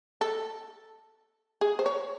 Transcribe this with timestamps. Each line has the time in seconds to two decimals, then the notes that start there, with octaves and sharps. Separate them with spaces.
0.21 A4
1.61 G#4
1.79 C5
1.86 C#5